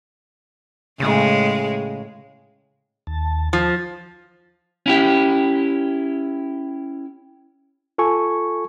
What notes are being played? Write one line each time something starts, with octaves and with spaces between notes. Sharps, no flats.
A2 C#3 G#3
D#2 A5
F3
C#4 E4 G4
F4 A4 G#5 C#6